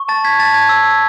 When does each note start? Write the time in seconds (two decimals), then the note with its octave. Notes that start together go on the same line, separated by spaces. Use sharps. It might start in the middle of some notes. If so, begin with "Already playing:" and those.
Already playing: C#6
0.09 A5 A6
0.25 G#6 B6
0.39 A5 A6
0.54 G#6
0.69 E6